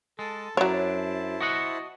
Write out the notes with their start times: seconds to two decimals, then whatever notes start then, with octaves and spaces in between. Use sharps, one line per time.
0.19 G#3 A4 A5
0.57 F#2 F#3 D4 E4 C5 C#5 A5
1.41 F#4 D#5 F#5